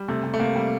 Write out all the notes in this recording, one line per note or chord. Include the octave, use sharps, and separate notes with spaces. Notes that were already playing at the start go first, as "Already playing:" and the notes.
Already playing: G3
C3 A3
C3
A3
C3 A#3
G3